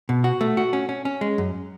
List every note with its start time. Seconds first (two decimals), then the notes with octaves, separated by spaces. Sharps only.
0.09 B2
0.24 F#4
0.41 A3
0.57 F#4
0.73 C#4
0.89 C#4
1.05 C#4
1.21 G#3
1.38 F#2